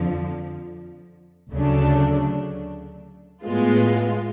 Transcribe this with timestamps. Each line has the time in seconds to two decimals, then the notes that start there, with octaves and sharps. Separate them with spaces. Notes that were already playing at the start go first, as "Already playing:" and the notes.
Already playing: F2 D3 F3
1.51 D2 C#3 F#3 A3 D4
3.43 A2 G#3 B3 F4